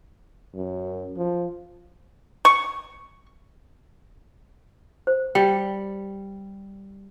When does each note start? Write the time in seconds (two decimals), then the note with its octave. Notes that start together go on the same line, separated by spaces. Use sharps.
0.55 F#2
1.17 F3
2.45 C#6
5.07 C5
5.35 G3 G5